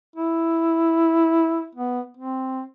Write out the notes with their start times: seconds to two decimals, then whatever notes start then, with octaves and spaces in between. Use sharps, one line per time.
0.16 E4
1.75 B3
2.17 C4